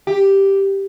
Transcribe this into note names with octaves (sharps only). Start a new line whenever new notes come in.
G4